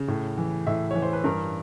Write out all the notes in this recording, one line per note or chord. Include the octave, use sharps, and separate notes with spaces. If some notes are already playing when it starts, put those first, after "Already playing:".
Already playing: C#3
A2
E3
A2 E5
E3 C#5
C5
B4
G2 A#4